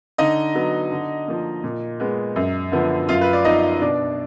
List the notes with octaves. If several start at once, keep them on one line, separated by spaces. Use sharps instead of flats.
D3 D#4 D#5
F#3 B3
D3
F3 A#3
A#2
G#3 B3
F#2
D3 F3 B3
F#2 F4 F5
B4
D5
F3 B3 D#4 D#5
B2 D4 D5